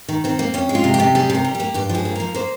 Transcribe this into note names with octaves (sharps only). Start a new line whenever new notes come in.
D#3
D#3 C4
A#3
F2 C#4
G#3
F4
C3
G4
C3
G3 G#4
C3
A#4
G3
G4
A#3
G2 G4
F3
G#4
A#3
F3 A#4
A#3 C5